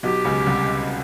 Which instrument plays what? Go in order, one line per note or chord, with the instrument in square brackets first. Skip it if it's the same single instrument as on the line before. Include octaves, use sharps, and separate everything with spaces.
[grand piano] B1 B2 [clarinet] G4
[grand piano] C#2 C#3
C2 C3